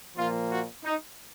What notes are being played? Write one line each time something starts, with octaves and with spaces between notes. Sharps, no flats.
A#2 F3 A#3 F4
F#4
D#4